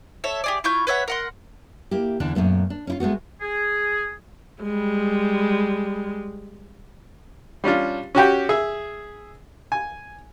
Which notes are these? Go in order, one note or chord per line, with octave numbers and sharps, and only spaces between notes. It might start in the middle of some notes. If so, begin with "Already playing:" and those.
A4 C#5 E5
G4 G#4 D5
E4 F4 C#6 G6
B4 C#5 E5 F#5
A#4 F#5 C6
A#3 E4 G4
E2 D3 E3 D4
F#2 A#2 A3 B3
D4
C#4 E4 F4
G#3 A3 B3 F#4
G#4
G3 G#3
G3 C#4 D4 F4
C#4 F#4 G4 G5
G#4 E5
G#5